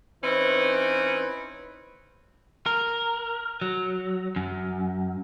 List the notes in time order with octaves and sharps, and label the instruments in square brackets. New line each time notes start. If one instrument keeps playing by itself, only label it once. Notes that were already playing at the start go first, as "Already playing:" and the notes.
[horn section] E3 C4 C#4 D#4 B4
[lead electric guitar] A#4
F#3
F#2